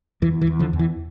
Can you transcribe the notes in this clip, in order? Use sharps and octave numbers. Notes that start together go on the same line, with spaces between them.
E2 E3
E3
E2
D3 F3
E2
E3